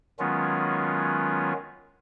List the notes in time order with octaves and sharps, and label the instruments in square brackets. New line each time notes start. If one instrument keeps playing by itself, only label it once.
[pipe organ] D#3 F#3 G#3 B3 C#4 F4